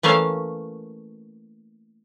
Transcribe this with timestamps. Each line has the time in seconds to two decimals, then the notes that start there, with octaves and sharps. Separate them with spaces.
0.03 E3 A3 A#3 C#4 F5